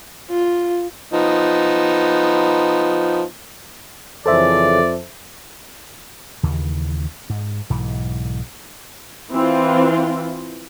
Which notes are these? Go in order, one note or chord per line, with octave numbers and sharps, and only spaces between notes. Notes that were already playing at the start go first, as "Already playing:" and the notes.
F4
F3 B3 D#4
F2 C#3 E3 A4 C5 D5 E5
D#2 C#3 E3
G#2
B1 G#2 E3
E3 C4 F4